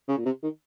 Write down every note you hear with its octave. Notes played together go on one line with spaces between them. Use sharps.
C#3
A#2
C3
D#3